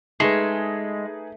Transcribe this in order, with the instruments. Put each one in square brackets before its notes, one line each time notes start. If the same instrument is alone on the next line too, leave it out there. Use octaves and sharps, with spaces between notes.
[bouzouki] G#3 [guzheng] A3 [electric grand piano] D#4 G#4 B4